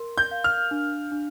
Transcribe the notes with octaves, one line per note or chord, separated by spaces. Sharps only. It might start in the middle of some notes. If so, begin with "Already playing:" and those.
Already playing: A#4 C6
G6
F5
F6
D4
D4